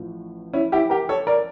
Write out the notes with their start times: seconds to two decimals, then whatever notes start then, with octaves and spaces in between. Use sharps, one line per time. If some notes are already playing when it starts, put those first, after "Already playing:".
Already playing: A1 A2 F3
0.53 C#4 E4
0.72 E4 G4
0.90 G4 A#4
1.09 A4 C#5
1.27 A#4 D5